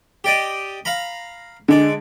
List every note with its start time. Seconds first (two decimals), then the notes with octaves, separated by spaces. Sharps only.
0.24 G4 D5 D#5
0.85 F5 A#5 B5
1.69 D3 G#3 D5